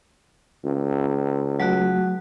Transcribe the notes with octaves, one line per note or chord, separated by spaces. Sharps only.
C#2
F#3 A3 F#4